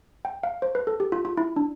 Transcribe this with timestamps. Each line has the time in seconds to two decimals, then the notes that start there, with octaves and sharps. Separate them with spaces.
0.25 G5
0.43 F5
0.62 C5
0.75 B4
0.87 A4
1.00 G4
1.12 F4
1.25 F4
1.37 E4
1.56 D4